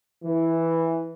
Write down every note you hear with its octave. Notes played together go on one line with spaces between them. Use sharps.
E3